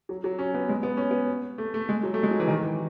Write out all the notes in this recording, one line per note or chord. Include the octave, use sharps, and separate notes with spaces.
F#3
F#3
C#4
B3
G#3
B3
C#4
B3
A3
A3
G#3
F#3
A3
G#3
F#3
E3
D#3
E3